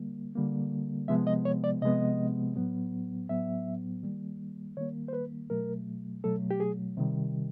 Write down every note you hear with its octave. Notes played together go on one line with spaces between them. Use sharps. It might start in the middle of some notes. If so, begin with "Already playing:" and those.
Already playing: D3 G3 A#3
D3 G3 A#3
C3 F3 G#3 B3 E5
D#5
C#5
D5
C3 F3 G#3 B3 D#5
A2 F#3 B3
A2 F#3 B3 E5
D#3 G3 A#3
D#3 G3 A#3 C#5
C5
B4
B2 F#3 A3 A#4
B2 F#3 A3 A4
G4
G#4
C3 D#3 G3